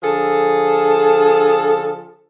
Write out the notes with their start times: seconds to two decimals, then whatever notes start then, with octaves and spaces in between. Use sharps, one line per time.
0.03 D3 F3 G#4 A4